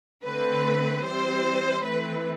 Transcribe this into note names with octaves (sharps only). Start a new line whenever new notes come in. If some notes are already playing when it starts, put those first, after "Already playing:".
D3 A3 C4 B4
E3 G3 C4 C5
E3 A3 C4 B4